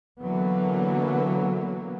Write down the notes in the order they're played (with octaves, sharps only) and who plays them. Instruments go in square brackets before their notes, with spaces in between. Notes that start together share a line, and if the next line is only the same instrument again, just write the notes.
[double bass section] D3 E3 F#3 A#3 B3